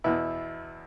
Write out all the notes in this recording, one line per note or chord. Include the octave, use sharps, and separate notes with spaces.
E2 B2 E4